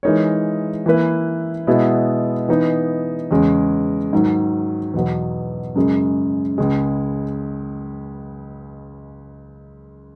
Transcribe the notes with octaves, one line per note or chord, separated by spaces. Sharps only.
E3 G#3 D#4 A#4 C#5
E3 A#3 E4 B4
B2 G#3 B3 E4
E3 B3 D#4
E2 C#3 G#3 C#4
G#2 D#3 F#3
E2 B2 F#3 B3
F#2 C#3 G#3
C#2 C#3 G#3